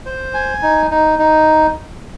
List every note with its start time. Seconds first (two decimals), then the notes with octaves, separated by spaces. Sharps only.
0.06 C5
0.34 G#5
0.62 D#4
0.91 D#4
1.19 D#4